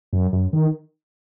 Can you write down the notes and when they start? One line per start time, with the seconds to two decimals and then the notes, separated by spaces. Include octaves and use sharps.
0.13 F#2
0.33 F#2
0.53 D#3